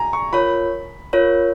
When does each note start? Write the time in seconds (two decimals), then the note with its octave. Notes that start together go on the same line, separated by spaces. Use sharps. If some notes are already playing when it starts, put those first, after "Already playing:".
Already playing: G#5 A#5
0.13 C#6
0.33 F4 A#4 C#5 B5
1.13 F4 A#4 C#5